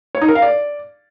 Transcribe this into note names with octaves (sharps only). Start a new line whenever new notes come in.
C#5
D#4
A#4
F5
D5